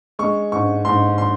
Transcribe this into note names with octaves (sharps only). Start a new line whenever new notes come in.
G#3 C#6
G#2 C#6
G#2 C6
C6